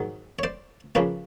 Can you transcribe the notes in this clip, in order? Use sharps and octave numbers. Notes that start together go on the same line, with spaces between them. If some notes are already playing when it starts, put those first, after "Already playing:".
Already playing: G#2 D#3 F#3
C#5
C5 D5
C#3 F3 A#3 B4 C#5